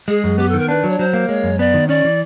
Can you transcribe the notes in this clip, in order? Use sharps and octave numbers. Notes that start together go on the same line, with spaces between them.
G#3 G#4
F#2
B3 G4
D#3 A4
A#4
D4 B4
F#3
C#5
F#3 C5
A#3
G#3 C#5
F#2
B3 D5
D#3
C#4 D5
E3